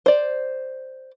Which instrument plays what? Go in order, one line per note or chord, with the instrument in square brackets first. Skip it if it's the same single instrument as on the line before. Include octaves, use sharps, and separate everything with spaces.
[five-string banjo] C5 D5